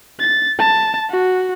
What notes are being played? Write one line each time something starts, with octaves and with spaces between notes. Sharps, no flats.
A6
A5
F#4